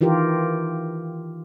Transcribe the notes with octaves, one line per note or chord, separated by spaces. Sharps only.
D#3 E3 F4 G4 A#4